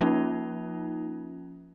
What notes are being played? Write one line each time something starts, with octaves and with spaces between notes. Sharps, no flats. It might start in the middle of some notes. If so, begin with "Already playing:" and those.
F3 A#3 C#4 D#4 F4